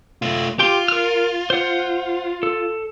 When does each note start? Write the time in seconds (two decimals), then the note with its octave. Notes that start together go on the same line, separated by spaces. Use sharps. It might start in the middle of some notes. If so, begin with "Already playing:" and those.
0.22 A3 F4
0.59 F4 G4 G5 C6
0.88 A#4 F6
1.50 C5 F#5
2.43 A4